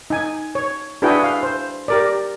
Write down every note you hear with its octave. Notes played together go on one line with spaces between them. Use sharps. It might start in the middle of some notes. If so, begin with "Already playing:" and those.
D#4 G#5
C#5
D4 E4 F#4 G#4 B4 G5
F5
C5
G4 A#4 D5